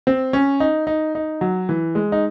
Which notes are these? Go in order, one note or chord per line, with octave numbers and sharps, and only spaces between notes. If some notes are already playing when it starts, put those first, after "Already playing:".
C4
C#4
D#4
D#4
D#4
F#3
E3
G#3
D#4